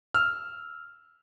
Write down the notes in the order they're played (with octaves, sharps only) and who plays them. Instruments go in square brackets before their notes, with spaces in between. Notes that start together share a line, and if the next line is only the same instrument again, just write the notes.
[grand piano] E6 F6